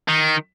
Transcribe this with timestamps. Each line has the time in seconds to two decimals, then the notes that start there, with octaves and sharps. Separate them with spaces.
0.09 D#3